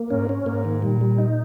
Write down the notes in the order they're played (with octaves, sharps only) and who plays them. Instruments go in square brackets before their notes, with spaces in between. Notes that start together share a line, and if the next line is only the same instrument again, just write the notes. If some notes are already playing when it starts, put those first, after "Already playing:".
Already playing: [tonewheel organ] A#3
[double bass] G#2 [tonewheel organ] C#4
[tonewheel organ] C#4
[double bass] G#2 [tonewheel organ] A#3
[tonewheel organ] D#3
[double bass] A#2 [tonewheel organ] G3
[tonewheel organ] G3
D#4